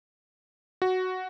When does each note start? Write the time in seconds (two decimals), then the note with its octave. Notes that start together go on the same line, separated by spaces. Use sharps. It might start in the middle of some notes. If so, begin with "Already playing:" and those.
0.82 F#4